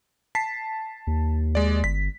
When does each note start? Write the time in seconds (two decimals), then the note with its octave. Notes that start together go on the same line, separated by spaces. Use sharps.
0.35 A5 B6 C7
1.07 D#2
1.55 G#3 D5
1.84 G1 B6